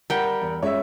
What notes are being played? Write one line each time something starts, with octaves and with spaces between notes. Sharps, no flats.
G3 A#4 F#5 G5
E2
G#3 C#4 F4 C#5 E5